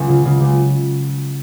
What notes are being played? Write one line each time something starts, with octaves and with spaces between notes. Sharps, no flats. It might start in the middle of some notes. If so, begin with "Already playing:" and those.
Already playing: C#2 F#5
C#3
C#3
C#2